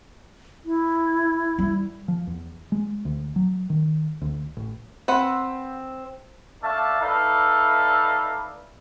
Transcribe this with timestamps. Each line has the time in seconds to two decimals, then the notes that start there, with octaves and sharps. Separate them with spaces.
0.65 E4
1.59 G3
2.08 F3
2.27 E2
2.72 G#3
3.05 D2
3.36 F#3
3.70 D#3
4.22 D2
4.57 A1
5.08 C4 B4 F#5
6.62 A3 D4 D5 E5 F5 A5
7.01 D#4 A4 B4 D5 E5 F5